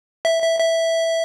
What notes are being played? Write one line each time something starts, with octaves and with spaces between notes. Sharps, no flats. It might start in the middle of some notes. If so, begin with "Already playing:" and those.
E5
E5
E5